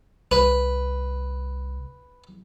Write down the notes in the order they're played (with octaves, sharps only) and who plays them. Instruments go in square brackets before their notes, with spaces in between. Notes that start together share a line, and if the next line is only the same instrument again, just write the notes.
[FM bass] C2 [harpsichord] B4